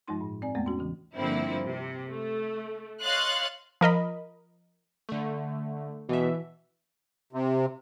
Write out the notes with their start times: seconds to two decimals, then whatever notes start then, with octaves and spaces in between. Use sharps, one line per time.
0.07 G2 F3 G#3 D#4 C6
0.21 A2
0.42 C4 D5 G#5
0.55 E2 G#3 A3 B3
0.66 C#4 F#4
0.79 C#3 E3
1.15 G2 D3 F3 A#3 C4 E4
1.63 C3
2.09 A3
3.03 C#5 D#5 F5 C6 F#6 A6
3.81 F3 A#4 D#5 B5
5.09 D3 A3
6.09 B2 E3 E5
7.33 C3